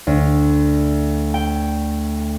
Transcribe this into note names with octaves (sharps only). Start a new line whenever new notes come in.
D2
G5